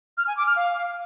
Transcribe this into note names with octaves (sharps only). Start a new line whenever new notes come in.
F6
G#5
D6
F6
F5